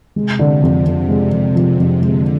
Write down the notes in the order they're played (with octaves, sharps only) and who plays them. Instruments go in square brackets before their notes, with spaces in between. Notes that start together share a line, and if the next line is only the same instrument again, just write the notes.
[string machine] C3 [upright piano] G#3
[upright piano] D3
F2
F2
G#3
F2
F3
F2
[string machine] D3 [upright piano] G#3